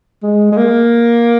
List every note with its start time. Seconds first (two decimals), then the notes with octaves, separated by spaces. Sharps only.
0.23 G#3
0.52 G#3
0.57 A#3